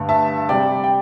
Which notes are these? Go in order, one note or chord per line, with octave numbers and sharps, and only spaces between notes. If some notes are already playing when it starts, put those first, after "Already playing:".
Already playing: G2 D3 A3
E5 A5
C3 G3 D5 G5
G5